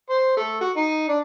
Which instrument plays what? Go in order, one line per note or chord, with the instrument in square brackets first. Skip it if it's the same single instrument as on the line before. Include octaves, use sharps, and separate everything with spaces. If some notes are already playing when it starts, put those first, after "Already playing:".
[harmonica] C5
A3
F#4
D#4
D4